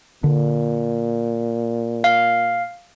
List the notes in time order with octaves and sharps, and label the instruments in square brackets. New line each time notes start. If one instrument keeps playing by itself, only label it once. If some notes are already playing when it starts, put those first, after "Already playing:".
[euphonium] A#2 [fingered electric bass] D3
[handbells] F5